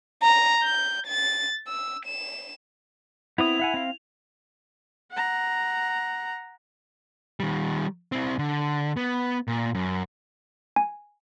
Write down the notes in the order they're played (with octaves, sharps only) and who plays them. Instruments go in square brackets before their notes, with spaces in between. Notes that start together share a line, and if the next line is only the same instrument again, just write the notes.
[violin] A#5
G6
A6
E6
E7
[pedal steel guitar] B3 C4 D#6 [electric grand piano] E4 [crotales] F7
[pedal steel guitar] E5 F#5 G#5
C4 F5
[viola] F#5 A#5
[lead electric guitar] D#3 G3
C4 E4
D3
B3
A#2
F#2
[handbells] G#5